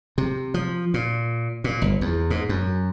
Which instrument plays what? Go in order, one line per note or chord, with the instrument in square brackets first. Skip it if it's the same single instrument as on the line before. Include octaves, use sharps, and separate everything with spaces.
[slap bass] C3
F3
A#2
A#2
G1
E2
G#2
F#2